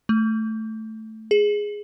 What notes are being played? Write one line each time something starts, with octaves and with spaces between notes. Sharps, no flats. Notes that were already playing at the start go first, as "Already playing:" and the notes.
A3
G#4